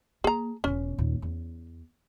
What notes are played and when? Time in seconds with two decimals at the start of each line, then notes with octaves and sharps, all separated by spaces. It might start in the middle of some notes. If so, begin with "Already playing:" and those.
0.24 A#3 G#4 A#5
0.64 E1 B2 C#4
0.98 D#2 A#2
1.22 E2